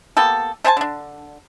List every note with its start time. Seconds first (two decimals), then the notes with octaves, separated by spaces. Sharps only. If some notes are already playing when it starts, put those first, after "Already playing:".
0.17 A#3 B3 G4 A4
0.64 A3 C5 G#5 A5
0.77 D3 D4